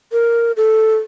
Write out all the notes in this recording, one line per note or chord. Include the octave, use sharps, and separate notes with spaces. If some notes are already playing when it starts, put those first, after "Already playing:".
A#4
A4